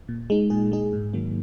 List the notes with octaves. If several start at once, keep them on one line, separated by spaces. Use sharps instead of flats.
A#2
G#3 D#4
A#2 G#4
G#3 D#4 G#4
G#2
D#3 F#3 A#3